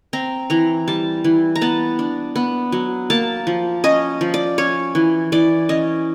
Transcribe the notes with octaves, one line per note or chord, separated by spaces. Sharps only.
C4 A#5
E3 A#5
G3 A5
E3
A#5
B3 A5
D4
B3
F#3
A#3 A5
F3
C#4 D#5
F3
D5
C#4 C#5
E3
E3 D5
C#4 D#5